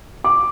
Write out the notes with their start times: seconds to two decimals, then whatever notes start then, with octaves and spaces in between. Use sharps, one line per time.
0.24 D6